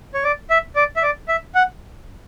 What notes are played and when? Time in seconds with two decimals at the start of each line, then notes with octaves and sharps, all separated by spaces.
0.14 C#5
0.24 D5
0.50 E5
0.76 D5
0.96 E5
1.03 D5
1.28 E5
1.55 F#5